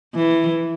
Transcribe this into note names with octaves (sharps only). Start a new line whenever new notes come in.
E3